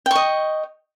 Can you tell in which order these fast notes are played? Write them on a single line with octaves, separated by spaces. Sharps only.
G5 C#6 D#5